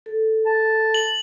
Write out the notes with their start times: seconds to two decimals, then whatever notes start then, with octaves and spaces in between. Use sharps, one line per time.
0.06 A4
0.46 A5
0.94 F#7